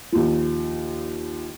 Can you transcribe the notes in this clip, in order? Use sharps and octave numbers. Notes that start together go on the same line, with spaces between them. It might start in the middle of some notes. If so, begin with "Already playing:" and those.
D#2 F3